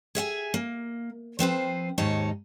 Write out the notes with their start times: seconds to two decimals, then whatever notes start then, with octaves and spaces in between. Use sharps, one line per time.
0.15 G#4 E5 F#5 G#5
0.54 A#3
1.39 F3 C4 B4 C5
1.98 D#2 G#2 D#4 C#5 A5